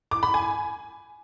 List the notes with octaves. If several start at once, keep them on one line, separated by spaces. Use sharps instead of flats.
D6
B5
G#5